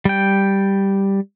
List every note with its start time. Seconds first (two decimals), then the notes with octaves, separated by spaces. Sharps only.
0.05 G3 G5